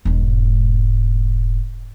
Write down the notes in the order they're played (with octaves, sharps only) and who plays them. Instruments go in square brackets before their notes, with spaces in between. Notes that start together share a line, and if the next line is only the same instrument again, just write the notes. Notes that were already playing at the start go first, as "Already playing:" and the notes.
[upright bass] E1 G#2